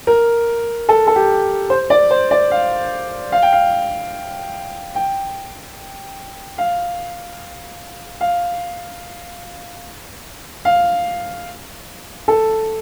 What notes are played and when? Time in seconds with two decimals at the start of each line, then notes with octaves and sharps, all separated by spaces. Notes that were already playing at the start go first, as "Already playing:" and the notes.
0.07 A#4
0.89 A4
1.07 A4
1.16 G4
1.70 C5
1.90 D5
2.11 C5
2.31 D5
2.51 F5
3.32 F5
3.42 G5
3.53 F5
4.95 G5
6.58 F5
8.21 F5
10.65 F5
12.28 A4